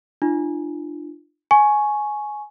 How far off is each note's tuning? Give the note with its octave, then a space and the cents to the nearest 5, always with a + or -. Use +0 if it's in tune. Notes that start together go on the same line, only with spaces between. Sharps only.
D4 +30 F4 -30
G#5 +15 C#6 -5